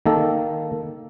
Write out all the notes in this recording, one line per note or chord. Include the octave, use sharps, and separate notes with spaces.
D#3 A#3 A4